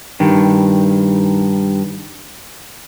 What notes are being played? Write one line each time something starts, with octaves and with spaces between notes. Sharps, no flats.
G2 D#3